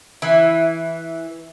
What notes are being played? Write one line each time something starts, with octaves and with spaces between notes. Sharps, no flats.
E3